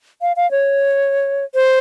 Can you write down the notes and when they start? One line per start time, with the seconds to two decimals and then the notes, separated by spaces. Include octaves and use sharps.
0.22 F5
0.36 F5
0.51 C#5
1.55 C5